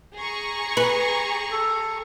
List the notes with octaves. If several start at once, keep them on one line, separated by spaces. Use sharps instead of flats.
G#4 A#5 C#6
B4
A4